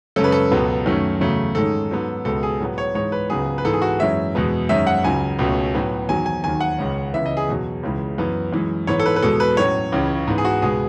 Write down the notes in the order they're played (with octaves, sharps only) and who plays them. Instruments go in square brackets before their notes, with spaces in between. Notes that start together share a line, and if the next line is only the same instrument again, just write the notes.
[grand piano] F#2 C#3 G#3 C#4 A4
B4
A4
C#2 B2 F#3 B3
F#2 D#3 F#3 A3 C#4
E2 C#3 F#3 A3
G#2 D#3 G#3 C#4 A4
G#2 F#3 B3
C#2 B2 G#3 B3 A4
G#4
A2 F#3 B3
C#5
G#2 E3 G#3 C#5
B4
C#2 C#3 F#3 B3 G#4
B4
G#2 E3 B3 A4
G#4
F#4
F#2 E3 G#3 C#4 E5
E2 B2 G#3 B3
F#2 D#3 G#3 C#4 E5
F#5
C#2 C#3 F#3 G#5
C#2 B2 A3 C#4
A2 F#3 B3
E2 D#3 F#3 G#5
G#5
D#2 D#3 F#3 G#5
F#5
C#2 C#3 G#3 C#4
C#2 C#3 E3 B3 E5
D#5
G#4
E2 B2 F#3
C#2 C#3 E3 G#3
F#2 E3 B3
F#2 E3 G#3
G#2 E3 B3 C#5
A4
B4
B4
E2 B2 G#3 A4
B4
A2 F#3 C#4 C#5
C#2 C#3 E3
G#2 E3 B3
G#4
F#4
C#2 B2 G#3 B3 G#4